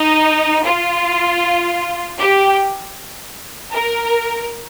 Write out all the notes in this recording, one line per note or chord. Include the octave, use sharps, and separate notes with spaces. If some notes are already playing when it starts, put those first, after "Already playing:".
Already playing: D#4
F4
G4
A#4